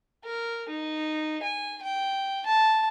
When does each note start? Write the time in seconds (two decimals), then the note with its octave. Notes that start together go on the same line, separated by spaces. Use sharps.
0.24 A#4
0.69 D#4
1.43 G#5
1.83 G5
2.46 A5